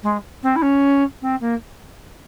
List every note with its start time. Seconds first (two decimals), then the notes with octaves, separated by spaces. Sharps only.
0.03 G#3
0.43 C4
0.56 E4
0.62 C#4
1.22 C4
1.41 A#3